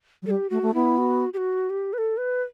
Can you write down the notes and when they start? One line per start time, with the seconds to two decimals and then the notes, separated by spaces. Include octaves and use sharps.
0.22 F#3
0.26 G3 A4
0.31 G4
0.50 A3 F#4
0.62 A3
0.74 B3 E4
0.98 F#4
1.33 G4
1.37 F#4
1.70 G4
1.93 B4
1.98 A4
2.17 B4